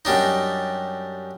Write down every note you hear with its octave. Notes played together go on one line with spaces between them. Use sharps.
F#2 G3 D4 D#4